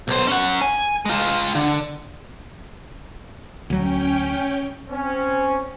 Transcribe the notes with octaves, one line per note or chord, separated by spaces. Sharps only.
B1 C5
C#4 F#5
G#5
G#3 F4
D3
D2 F#3 C#4 G5
C4 C#4